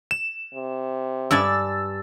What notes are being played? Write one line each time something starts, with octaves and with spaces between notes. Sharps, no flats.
E7
C3
G2 D4 G#5 E6 A6